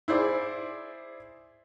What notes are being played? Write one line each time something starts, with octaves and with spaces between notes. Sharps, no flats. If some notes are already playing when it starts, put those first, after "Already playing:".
E4 G#4 C5 D5